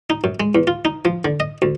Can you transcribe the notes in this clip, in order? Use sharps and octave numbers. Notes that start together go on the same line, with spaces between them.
D#4
F#2
G#3
E2
F4
D#4
F3
D3
D#5
D2